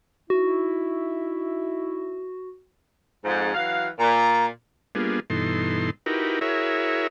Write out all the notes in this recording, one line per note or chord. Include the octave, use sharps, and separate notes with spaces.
D#4 E4 F#4 E5
F2 G#2
E3 F#3 F5
A#2 A#5
G3 A#3 B3 D4 F4 G#4
G2 B2 E3 D#4 A4 C6
D#4 E4 F#4 G4 A#4 B4
E4 F#4 G#4 A#4 C#5 E5